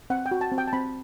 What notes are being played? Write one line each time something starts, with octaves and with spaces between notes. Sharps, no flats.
C4 F#5
G5
F#4
A5
C4
G5
A5
C4 B5